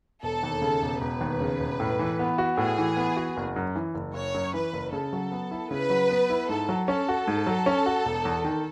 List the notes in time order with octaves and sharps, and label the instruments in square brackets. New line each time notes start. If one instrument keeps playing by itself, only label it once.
[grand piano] E1 [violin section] A4
[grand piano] D#2
C#3
E1
[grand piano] E1 [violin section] B4
[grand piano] D#2
C#3
E1
A2
E3
B3
F#4
[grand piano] A2 [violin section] G#4
[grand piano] E3
B3
F#4
F#1
F#2
E3
F#1
[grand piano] F#1 [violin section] C#5
[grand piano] F#2
[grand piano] E3 [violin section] B4
[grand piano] F#1
[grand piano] C#3 [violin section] A4
[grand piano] F#3
B3
E4
[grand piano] C#3 [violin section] B4
[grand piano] F#3
B3
E4
[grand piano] G#2 [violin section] A4
[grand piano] F#3
[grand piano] C#4 [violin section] A4
[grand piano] F#4
G#2
F#3
C#4
F#4
E1
E2
D#3